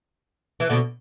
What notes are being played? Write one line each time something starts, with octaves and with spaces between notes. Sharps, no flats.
E3
B2 D3